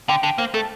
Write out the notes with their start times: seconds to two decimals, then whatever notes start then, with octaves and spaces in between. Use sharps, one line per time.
0.09 D3 G5
0.23 D3 G5
0.38 A#3 C5
0.54 A3 A4